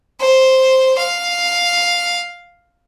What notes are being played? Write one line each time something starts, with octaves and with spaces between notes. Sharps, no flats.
C5
F5